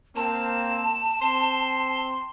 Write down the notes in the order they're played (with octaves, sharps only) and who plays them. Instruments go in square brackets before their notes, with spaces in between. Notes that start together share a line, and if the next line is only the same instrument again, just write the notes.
[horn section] A#3 C4 [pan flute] A5
[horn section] C4 C6